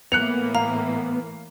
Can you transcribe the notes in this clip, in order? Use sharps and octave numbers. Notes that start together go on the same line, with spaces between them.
A2 E3 A#3 B3 F#6 C#7 F7
F5 A#5